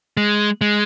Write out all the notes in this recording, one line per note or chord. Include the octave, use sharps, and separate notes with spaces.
G#3
G#3